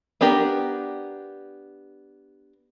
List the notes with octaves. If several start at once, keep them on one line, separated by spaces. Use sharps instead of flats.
B3 D4 G4 A#4